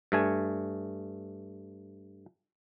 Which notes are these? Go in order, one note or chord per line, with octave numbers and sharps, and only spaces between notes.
G2 A3 G#5